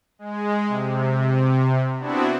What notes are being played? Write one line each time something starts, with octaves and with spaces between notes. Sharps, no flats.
G#3
C3
B3 C4 D4 E4 F#4